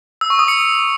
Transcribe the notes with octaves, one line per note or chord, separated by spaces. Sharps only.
E6
C#6
D#6
C#7